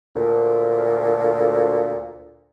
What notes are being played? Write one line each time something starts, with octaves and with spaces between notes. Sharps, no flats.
D2 A#2